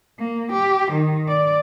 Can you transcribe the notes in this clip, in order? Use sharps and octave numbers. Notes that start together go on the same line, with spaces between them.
A#3
G4
D#3
D5